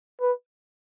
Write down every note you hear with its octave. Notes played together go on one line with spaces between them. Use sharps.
B4